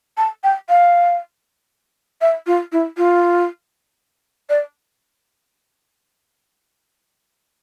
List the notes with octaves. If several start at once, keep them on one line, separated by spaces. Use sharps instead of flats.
A5
G5
F5
E5
F4
E4
F4
D5